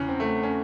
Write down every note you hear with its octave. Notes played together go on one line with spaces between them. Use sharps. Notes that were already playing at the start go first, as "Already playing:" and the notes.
Already playing: E2 C#3 E3 C#4
C4
A3
C#4